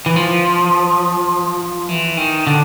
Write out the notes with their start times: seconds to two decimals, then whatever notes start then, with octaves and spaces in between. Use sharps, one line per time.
0.06 E3
0.16 F3
1.89 E3
2.17 D#3
2.47 D3